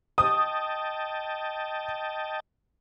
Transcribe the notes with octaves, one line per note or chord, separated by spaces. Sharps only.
D#5 G5 A5 D#6